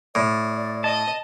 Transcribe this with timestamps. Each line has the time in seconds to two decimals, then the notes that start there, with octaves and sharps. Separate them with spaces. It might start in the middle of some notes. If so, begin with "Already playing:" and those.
0.15 A2 D5
0.84 D#5 A5